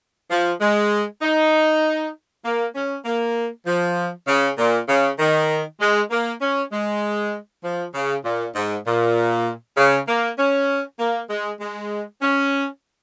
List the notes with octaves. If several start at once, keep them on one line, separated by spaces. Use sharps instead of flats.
F3
G#3
D#4
A#3
C#4
A#3
F3
C#3
A#2
C#3
D#3
G#3
A#3
C#4
G#3
F3
C#3
A#2
G#2
A#2
C#3
A#3
C#4
A#3
G#3
G#3
C#4